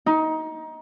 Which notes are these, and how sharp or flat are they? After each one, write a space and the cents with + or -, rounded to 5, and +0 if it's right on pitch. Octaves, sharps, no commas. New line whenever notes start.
D#4 +20